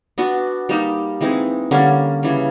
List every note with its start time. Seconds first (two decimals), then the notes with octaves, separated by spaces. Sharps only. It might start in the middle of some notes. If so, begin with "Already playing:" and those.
0.18 B3 D4 F#4
0.69 G3 A#3 D#4 G4
1.21 E3 G#3 C4 D#4
1.71 D3 G3 A#3 C#4
2.23 C#3 E3 G3